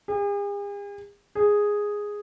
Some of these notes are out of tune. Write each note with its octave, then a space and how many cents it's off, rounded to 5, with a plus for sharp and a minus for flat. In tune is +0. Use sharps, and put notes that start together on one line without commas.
G#4 -45
G#4 -5